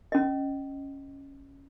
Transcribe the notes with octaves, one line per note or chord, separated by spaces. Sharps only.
C#4 D#5